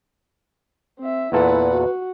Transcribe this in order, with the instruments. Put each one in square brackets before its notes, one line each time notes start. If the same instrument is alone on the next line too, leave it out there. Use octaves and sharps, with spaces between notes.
[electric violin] C4 E5
[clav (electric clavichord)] E2 A#2 A4 [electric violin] E4 F#5 [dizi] B4
[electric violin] F#4